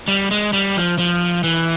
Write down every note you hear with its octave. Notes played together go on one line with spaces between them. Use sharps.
G3
G#3
G3
F3
F3
E3